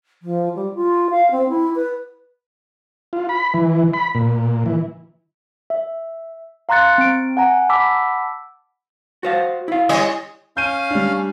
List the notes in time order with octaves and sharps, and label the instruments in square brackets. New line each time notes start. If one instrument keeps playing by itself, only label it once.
[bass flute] F3
G3
F4
F5
C4
E4
B4
[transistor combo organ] F4
B5
E3
B5
A#2
E3
[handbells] E5
F5 A#5 C6 F#6 A6 C#7
C4 D7
F#5 G#5 A#5
F#5 A5 B5 D6 E6 B6
[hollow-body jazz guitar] F#4 C5 F5
E4 F5
[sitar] G3 C#5 D#5
[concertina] C#4 F5 [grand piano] G6 D#7
[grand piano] G3 D4